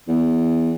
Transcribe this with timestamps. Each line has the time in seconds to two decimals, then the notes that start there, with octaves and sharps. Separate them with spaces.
0.08 E2